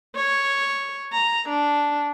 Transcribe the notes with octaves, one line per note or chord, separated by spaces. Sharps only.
C#5
A#5
D4